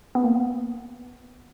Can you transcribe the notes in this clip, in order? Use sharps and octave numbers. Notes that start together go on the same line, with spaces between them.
B3
A#3